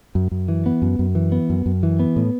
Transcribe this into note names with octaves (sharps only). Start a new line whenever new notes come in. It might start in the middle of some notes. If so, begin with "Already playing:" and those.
F#2
F#2
E3
B3
F#2
F#2
E3
B3
F#2
F#2
E3
B3
A2